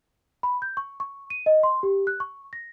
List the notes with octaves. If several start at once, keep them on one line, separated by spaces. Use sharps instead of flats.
B5
G6
C#6
C#6
D#7
D#5
C6
G4
F#6
C#6
A#6